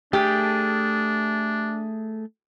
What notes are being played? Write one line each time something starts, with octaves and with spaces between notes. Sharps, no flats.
A3 D4 G4 G#4